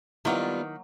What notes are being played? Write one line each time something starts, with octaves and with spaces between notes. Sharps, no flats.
D#3 F#3 G3 A#3 B3 E4 F4 F#5